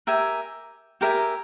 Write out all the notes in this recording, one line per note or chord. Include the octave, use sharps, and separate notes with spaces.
G4 A#4 E5 G#5
G4 A#4 E5 G#5